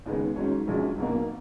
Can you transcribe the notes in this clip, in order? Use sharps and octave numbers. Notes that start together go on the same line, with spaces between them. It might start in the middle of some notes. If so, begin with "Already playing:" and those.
D#2 C#3 G#3 B3
G#2 D#3 F#3 C#4
A#1 A#2 G#3 C#4 F#4
B1 B2 A#3